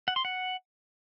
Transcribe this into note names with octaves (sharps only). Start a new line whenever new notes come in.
F#5
C6
F#5